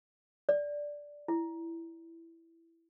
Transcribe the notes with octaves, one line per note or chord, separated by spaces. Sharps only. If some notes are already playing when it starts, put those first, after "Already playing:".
D5
E4